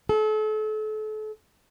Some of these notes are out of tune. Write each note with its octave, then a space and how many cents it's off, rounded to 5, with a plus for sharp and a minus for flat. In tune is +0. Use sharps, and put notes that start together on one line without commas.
A4 -35